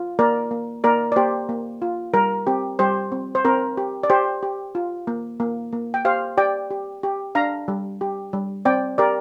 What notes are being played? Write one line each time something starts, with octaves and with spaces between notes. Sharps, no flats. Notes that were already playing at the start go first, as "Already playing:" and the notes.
Already playing: F4
A#3 A#4 D5
A#3
A#3 A#4 D5
D5
A#3 G4 C5
A#3
F4
G3 A#4
C4 G4
G3 G4 C5
C4
C5
C4 A#4
G4
D5
G4 C5
G4
F4
A#3
A#3
A#3
G5
G4 C5 F5
G4 D5 G5
G4
G4
D4 F5 A#5
G3
G4
G3
C4 D5 G5
G4 A#4 D5